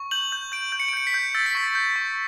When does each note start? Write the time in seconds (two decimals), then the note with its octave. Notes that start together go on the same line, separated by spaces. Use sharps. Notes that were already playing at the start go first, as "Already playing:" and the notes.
Already playing: C#6
0.11 G6 F#7
0.32 G6
0.52 G6 D7
0.72 G6
0.80 C#7
0.88 D7
0.93 G6 C#7
1.07 B6
1.14 G6
1.35 E6 A6
1.46 B6
1.55 C#6 A6
1.75 G6
1.96 C#6